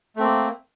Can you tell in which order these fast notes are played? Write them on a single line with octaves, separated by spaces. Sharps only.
A3 C4 A#3